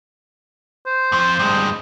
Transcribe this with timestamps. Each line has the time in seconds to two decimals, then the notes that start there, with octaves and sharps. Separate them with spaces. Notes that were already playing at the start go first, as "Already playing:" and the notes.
0.86 C5
1.12 F2 F3
1.39 G2 G#3